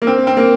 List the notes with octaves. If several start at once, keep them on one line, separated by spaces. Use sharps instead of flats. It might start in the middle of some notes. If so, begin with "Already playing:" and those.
A#3
C4
C4
A#3